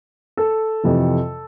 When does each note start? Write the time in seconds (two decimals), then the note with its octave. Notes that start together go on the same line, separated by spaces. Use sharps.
0.37 A4
0.83 F2 C3 E3